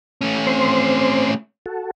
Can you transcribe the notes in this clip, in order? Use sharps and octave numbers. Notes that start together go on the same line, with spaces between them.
A3 C#4
C4 C5 C6
F#4 A4